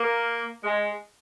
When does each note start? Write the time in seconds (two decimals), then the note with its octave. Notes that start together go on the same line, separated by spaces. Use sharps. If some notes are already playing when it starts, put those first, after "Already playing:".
Already playing: A#3
0.63 G#3